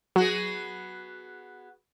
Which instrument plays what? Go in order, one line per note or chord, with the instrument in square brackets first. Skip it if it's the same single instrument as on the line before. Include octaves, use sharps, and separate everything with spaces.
[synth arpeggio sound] F#3 [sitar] B3 F#4 G#4